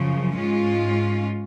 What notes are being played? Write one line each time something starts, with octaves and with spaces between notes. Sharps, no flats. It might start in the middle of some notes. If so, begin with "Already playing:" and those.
Already playing: F#2 C#3 F3
G#2 G#3 C#4 F4